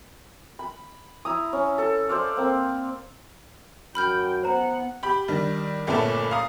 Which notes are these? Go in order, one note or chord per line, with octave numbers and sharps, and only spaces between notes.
B5
E4 A#5 D#6
C#4
A4
C5 D5 F5
A#3 C4
F#2 G5 B5 F6 G6
B3 C5 F#5 A#5
G4 B5
D#3 G3 D4
G1 A#2 A3 C#4 B4 A5
F5 A#5 D#6